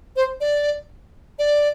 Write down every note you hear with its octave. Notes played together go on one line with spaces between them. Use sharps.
C5
D5
D5